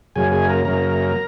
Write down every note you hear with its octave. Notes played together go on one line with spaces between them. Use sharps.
F#2 C#3 F#3 A#3 G#4 G#5
G#4 G#5
A#4 A#5
F#2 C#3 F#3 A#3 A#4 A#5